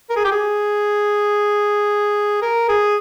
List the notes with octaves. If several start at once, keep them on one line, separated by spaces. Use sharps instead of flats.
A#4
G#4
G4
G#4
A#4
G#4